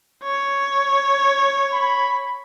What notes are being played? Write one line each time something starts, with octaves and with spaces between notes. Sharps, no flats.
C#5
B5